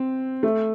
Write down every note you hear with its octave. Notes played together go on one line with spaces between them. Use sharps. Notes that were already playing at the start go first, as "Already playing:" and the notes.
Already playing: C4
A3